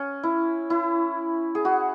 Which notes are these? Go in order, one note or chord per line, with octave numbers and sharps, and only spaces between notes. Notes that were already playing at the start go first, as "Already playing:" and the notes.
Already playing: C#4
E4
E4
G#4
F#4